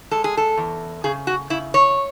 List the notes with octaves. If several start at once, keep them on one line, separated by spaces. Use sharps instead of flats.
G#3 A4
G#4
A4
E2
C#3 G#4
F#4
C#3 E4
C#5